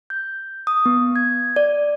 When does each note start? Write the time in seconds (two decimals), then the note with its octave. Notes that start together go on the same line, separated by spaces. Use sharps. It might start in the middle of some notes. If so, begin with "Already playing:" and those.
0.10 G6
0.67 D#6
0.86 B3
1.16 G#6
1.56 D5